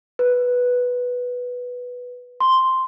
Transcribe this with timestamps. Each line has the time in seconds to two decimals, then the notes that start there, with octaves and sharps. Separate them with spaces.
0.19 B4
2.40 C6